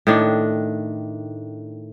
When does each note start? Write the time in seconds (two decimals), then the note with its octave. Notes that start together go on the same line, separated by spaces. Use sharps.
0.07 A2 D#3 D4